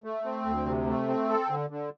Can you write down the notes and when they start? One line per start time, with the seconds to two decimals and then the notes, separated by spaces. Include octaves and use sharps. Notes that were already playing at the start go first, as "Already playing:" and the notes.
0.04 A3
0.25 C4
0.45 D2
0.66 C3
0.87 A3
1.08 C4
1.29 A4
1.49 D3
1.70 D3